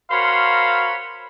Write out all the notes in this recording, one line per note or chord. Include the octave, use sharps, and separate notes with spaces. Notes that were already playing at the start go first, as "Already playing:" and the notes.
F#4 A#4 C5 C#5 F5 B5